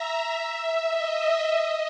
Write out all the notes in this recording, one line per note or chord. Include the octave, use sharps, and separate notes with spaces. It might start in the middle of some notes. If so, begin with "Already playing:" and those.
Already playing: E5 A#5
D#5
D#5